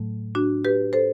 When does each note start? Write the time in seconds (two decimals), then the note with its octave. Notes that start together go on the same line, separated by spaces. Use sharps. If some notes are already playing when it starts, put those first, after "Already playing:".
Already playing: A2 F#3 A3
0.35 D4 F#4
0.65 G4 B4
0.93 A4 C5